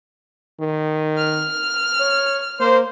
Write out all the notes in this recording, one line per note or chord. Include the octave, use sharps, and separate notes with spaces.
D#3
F6
C#5
A#3 C5